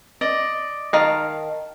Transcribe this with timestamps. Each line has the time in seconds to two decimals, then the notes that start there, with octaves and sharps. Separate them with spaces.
0.21 D5 D#5
0.93 D#3 D#5 F5 A5